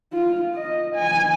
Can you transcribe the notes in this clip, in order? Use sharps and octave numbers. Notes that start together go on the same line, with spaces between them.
F4
D#5
G#5